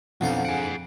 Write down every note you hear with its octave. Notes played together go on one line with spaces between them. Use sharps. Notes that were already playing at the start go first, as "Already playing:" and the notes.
B1 F2 D3 C5 F5 F#5
G#4 F#5 D7